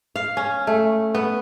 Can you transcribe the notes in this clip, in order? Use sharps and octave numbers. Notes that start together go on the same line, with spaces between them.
F5
C#4
A3
B3